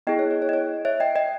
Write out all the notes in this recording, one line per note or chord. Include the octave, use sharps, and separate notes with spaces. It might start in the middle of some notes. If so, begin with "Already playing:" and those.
B3 E4 G#4 D#5 G5
C#5
C#5
C#5
D#5
C#5
C#5 E5
D#5 G5
D#5 G5